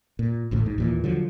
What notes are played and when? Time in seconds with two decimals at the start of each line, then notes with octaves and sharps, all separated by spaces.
0.19 A#2
0.51 A1 D2 A2
0.66 G#2
0.78 D#2 A#2 E3
1.04 D3 F3 F#3